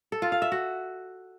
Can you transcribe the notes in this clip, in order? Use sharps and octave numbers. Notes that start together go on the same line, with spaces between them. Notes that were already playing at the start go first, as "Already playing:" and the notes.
A4
F4
F5
E5
F#4